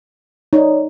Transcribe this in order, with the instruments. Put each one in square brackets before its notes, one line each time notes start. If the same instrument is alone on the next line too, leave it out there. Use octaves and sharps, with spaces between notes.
[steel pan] D#4 [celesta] C#5 D5